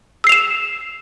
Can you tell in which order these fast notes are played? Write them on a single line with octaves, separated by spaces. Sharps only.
E6 C7 F7 E7